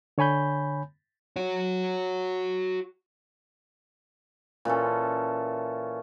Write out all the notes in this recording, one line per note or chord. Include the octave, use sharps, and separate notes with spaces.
D3 C#5 G#5 B5 G6
F#4 C#5
A#2 E3 C#4 A4